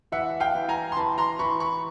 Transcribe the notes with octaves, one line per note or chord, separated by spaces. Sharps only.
E3 E5 F#5
F5 G5
E3
G#5 A#5
C6
E3 A5 B5
A#5 C6
E3 B5 C#6
B5 C#6